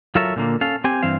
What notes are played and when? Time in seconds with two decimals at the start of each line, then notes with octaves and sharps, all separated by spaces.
0.15 F#3 F4 A4 A#4 C#5 E5
0.36 A#2 D3 A#3
0.61 C#4 A4 F5
0.84 C4 G4 G#5
1.03 G2 E3 C4 F5